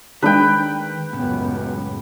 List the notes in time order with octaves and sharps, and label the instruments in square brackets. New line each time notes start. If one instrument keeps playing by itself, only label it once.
[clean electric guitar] D#3 [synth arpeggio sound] G#3 D4 G#4 [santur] B4 G5
[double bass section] C#2 F#2 B3 [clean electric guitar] A2 C#3